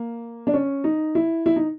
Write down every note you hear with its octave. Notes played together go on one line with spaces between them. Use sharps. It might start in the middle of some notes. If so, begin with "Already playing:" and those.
Already playing: A#3
D4
C#4
D#4
E4
E4
D#4